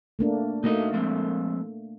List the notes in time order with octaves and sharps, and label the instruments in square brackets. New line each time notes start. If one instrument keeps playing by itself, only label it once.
[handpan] A3 A#3 D4
[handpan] A3 A#3 [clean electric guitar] D#4 F#4 D#5
[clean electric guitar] F3 G#3 C4